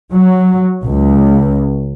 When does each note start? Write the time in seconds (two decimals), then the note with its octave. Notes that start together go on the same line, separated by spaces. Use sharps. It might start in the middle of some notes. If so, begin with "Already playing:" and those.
0.13 F#3
0.83 C#2